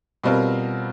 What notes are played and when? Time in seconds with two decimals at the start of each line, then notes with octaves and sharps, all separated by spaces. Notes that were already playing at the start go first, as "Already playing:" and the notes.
0.24 B2 G3 C4 F4 A#4